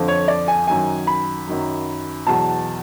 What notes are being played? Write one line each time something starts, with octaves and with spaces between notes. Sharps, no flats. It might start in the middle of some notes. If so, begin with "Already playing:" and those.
Already playing: F2 D3 F3
C#5
D5
G#5
F#2 D#3 F#3 G#5
B5
F#2 D#3 F#3
E2 B2 F#3 A5